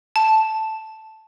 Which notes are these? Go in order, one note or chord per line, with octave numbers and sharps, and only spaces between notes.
A5